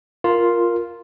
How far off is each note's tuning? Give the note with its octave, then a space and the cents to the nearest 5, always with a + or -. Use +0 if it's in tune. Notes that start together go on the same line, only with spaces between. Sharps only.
F4 +0 A#4 +5